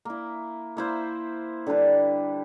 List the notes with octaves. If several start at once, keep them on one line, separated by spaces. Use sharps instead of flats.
A#3 E4
A#3 E4 C5
D3 G3 D4 B4